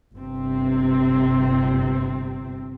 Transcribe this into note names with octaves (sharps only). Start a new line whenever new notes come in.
G1 C3 C4